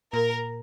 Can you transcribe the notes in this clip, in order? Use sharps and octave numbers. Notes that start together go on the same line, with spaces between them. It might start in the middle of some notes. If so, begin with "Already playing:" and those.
A#2 A#4